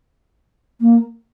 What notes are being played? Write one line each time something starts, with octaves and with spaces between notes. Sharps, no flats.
A#3